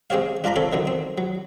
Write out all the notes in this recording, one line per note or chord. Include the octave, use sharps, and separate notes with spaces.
G#3 C4 G4 C#5 F5
D4 F4 D5 A#5 B5
C4 A4 C#5
F#2 D3 D#3
C4
F#3